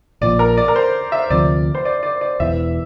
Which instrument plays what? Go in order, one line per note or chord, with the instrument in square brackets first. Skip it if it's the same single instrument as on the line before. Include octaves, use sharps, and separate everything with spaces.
[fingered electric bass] A#1 A#2 F3 [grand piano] D5
[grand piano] A#4
D5
A#4
C5
E5
[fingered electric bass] D2 C3 F3 [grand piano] D5
[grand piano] C5
D5
D5
D5
[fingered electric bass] E1 E2 E3 [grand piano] E5